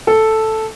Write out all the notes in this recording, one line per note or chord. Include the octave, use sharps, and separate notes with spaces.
A4